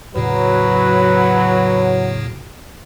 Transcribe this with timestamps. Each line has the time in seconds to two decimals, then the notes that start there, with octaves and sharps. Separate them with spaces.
0.16 E2 A2 C#3 F#3 B4